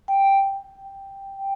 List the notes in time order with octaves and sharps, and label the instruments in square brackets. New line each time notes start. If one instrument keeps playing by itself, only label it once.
[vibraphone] G5